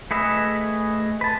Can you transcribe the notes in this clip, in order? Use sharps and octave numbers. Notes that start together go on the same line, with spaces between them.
A3 G#4 B4 D#5 E5
B4 A5